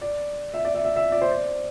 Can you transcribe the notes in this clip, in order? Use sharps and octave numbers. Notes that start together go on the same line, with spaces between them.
D5
E5
D5
E5
E5
E5
D5
C5
D5